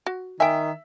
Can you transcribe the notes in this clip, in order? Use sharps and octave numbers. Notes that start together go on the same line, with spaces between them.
F#4
D#3 E5 G5 G#5